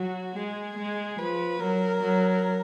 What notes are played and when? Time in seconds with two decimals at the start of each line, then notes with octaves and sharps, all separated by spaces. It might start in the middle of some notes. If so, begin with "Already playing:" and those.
Already playing: F#3 F#4
0.36 G#3 G#4
0.78 G#3
1.19 F3 B4
1.60 F#3 A#4
2.02 F#3